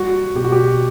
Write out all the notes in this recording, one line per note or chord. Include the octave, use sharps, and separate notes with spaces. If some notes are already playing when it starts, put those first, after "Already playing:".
Already playing: G3 F#4
B2 G4
F#4
G4